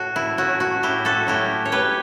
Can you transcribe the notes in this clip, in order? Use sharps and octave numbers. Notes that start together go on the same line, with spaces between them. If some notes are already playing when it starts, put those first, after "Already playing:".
Already playing: A2 A3 F#4
E4
F#3 A3 C#4 F#4
F#4
A2 E4 G4
F#4 A4
F#3 A3 C#4 E4 G4
C#5
A2 G4 B4